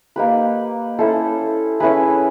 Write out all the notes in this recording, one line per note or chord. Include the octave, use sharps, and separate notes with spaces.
A#3 D#4 G4 B4
C#4 E4 A4 C5
C#4 E4 G#4 B4